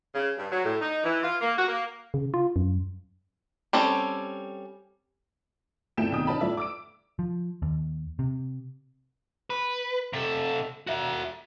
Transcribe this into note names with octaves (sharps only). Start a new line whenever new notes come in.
C#3
G2
F#3
A2
D#4
E3
F4
A#3
F#4
A#3
C#3
F4
F#2
G3 C4 C#4 A4
G#1 F2 A3 E4 G5 E7
B1 F2 D#3 G5 D#6
C#4 D#4 A5 B5
A2 F3 D5 E5
D6 E6 D7
F3
D#2
C3
B4
C3 A4
F#4 E5